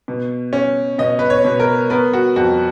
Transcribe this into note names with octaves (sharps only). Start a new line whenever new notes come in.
B2
C#4
B2 D#5
B4
C#5
B2
A#4
B3 A#4
F#4
F2 F#4